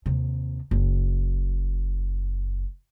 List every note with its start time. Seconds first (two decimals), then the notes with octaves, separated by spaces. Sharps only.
0.06 D#2 C3
0.71 F#1